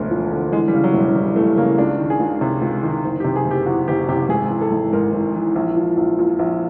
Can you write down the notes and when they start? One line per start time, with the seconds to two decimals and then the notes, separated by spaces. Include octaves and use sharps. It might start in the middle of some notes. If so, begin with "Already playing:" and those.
Already playing: E1 D2 D3
0.11 F3
0.31 D3
0.52 E3 G#3
0.68 G3
0.74 C#3
0.84 F#3
0.94 E1
1.00 G3
1.15 E2 G3
1.36 E3 A3
1.57 C#3 A#3
1.78 C#2 D4
1.99 D#3
2.10 G#4
2.20 C#2
2.41 C3
2.62 C#2
2.83 D#3
3.04 F#1
3.20 G4
3.24 C3
3.36 G#4
3.46 F#1
3.51 G4
3.66 E2 F#4
3.88 F#1 G4
4.08 C3 G4
4.29 G#1 G#4
4.50 E3
4.61 A4
4.72 G#1
4.93 G#2 A#4
5.13 G#1
5.34 E3
5.56 A#1
5.76 F3
5.97 A#1
6.19 A#2
6.39 A#1